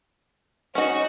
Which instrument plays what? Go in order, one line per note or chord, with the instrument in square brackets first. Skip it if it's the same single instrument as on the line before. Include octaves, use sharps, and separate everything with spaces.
[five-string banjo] C#4 D#4 [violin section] F#4